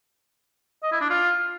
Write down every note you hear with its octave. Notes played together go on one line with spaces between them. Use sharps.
D#5
E4
D4
F4